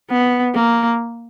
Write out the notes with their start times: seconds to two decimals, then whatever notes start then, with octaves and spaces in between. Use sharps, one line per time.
0.11 B3
0.55 A#3